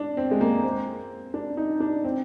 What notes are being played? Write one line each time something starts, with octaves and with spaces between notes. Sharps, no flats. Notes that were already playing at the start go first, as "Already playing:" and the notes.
Already playing: D4
C4
G#3
A#3
C4
D4
D#4
D4
C4